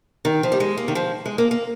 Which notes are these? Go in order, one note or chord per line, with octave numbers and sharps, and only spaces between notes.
D#3
F3
G3
G#3
A#3
D#3
F3
G#3
A#3
A#3